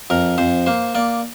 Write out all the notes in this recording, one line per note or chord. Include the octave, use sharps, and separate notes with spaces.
F2 A#4
F2 C5
A#3 C5
A#3 D5